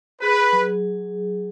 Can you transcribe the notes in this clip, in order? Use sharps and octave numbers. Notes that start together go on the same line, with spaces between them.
G#4 B4
F#3